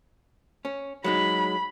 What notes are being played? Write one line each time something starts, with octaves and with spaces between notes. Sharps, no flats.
C#4
F#3 G#3 D#4 B5